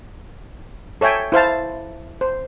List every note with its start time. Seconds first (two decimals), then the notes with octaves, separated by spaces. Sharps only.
1.01 A4 C#5 E5 G5 G#5
1.32 E4 C5 F5 A5
2.21 C5